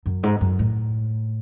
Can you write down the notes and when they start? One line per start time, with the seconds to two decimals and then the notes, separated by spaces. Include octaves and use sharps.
0.06 F#2
0.23 G#2
0.41 F#2
0.59 A2